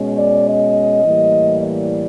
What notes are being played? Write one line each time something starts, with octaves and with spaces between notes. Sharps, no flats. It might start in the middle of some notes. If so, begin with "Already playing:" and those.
Already playing: B2 G#3 C#4
D5
D#5
A2 E3 G3 A#3
D5